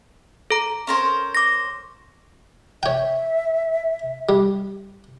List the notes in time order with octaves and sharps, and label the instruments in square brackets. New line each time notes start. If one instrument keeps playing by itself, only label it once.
[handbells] A4 A#5
[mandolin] C#4 A#4 C5
[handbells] D6 A#6
[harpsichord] C#5 G5 [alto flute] E5
[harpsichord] G3